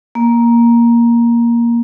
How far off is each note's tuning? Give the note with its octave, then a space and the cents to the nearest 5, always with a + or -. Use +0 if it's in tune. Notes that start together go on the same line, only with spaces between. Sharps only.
A#3 +10